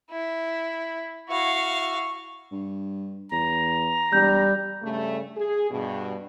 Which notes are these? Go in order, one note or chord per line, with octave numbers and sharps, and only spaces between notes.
E4
E4 F#4 F5 C#6
G2
E2 A#5
E1 G3 G6
G2 C#3 A3
G#4
G2 B2